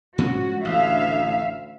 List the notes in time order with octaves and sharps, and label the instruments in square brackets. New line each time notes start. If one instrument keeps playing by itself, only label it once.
[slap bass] G#2 F3 C#4 [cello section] F#4
[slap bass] A1 [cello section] D2 E5 F5